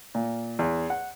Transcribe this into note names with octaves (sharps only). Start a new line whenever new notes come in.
A#2
E2
F#5